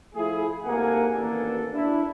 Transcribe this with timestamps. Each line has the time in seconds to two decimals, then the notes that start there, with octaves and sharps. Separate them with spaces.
0.14 F3 A3 E4 G#4
0.63 G#2 C3 A#3 A4 F#5 G#5
1.14 A1 D#2 A#3 B3 D4 A4
1.72 D4 E4